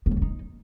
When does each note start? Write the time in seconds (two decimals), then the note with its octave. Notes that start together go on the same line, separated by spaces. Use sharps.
0.06 B3
0.11 F#3
0.17 A#3
0.22 D#4